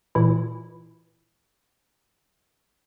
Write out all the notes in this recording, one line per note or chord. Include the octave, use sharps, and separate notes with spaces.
A#2 E3 E4